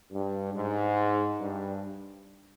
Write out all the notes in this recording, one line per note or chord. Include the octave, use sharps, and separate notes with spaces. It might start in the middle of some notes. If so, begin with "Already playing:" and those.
G2
G#2
G2